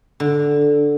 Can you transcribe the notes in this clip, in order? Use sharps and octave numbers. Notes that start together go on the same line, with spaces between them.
D3